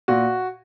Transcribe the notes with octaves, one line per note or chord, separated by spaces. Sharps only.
A#2 F#4